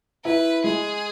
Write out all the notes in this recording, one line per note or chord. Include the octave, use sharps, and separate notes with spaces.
E4 B4
G#3 G#4